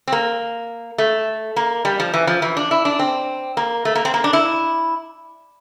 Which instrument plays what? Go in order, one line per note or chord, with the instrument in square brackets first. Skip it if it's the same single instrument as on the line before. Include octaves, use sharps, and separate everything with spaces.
[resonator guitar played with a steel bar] C4
A#3
A3
A#3
G3
F3
E3
F3
E3
D4
E4
D4
C4
A#3
A3
A#3
C4
A#3
D4
E4